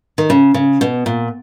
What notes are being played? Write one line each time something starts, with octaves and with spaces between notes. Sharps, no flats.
D#3
C#3
C#3
B2
A#2